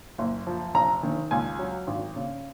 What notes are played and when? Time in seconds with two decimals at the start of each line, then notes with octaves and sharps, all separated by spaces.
0.18 F#1
0.47 F3
0.75 F1 A#5
1.03 D#3
1.31 C#2 G#5
1.59 F#3
1.87 G#1
2.16 C#3